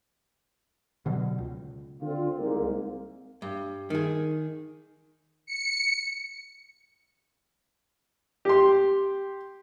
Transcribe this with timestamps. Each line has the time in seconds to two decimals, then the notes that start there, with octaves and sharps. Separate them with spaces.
1.06 B2 D3 F#3
1.38 C#2
2.02 D3 C4 F4
2.38 C2 G#2 A#3
3.42 G2
3.90 D#3 G#4
5.46 C#7
8.45 G4 C6